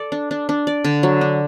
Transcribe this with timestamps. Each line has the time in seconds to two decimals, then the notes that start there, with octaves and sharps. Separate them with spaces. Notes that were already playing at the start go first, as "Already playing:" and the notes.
Already playing: A4 D5
0.12 D4
0.31 D4
0.49 D4
0.67 D5
0.84 D3
1.03 F#3
1.21 D4